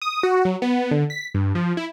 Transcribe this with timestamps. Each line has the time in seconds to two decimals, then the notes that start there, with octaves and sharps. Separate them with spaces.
0.02 D#6
0.23 F#4
0.45 F#3
0.62 B3
0.91 D3
1.10 B6
1.35 G2
1.55 F3
1.77 E4